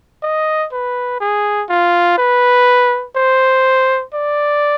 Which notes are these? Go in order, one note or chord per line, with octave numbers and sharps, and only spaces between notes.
D#5
B4
G#4
F4
B4
C5
D5